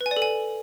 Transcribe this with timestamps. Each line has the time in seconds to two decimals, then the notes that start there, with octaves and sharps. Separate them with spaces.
0.01 B4
0.06 G#5
0.11 D5
0.17 A4
0.22 G#5